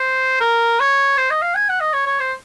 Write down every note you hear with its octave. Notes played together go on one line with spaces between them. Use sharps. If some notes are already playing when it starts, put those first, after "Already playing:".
Already playing: C5
A#4
C#5
C5
D#5
F5
G#5
F#5
D#5
C#5
C#5
C5